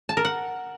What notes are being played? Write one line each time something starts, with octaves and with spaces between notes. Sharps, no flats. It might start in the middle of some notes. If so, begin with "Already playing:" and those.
A5
A#4
F#5